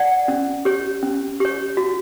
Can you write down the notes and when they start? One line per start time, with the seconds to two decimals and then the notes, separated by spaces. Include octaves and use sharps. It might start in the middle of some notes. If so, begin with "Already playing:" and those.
Already playing: D5 F#5
0.28 C#4
0.65 G4 C#5
1.03 C#4
1.40 G4 C#5
1.77 F#4